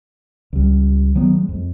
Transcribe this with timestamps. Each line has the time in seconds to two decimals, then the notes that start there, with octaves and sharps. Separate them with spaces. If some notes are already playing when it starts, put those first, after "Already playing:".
0.53 C#2 G3
1.15 D#3 F#3 A3 B3
1.36 G#3
1.49 F2